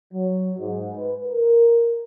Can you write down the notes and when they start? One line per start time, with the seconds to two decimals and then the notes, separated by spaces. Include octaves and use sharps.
0.13 F#3
0.59 G#2
0.95 B4
1.26 A#4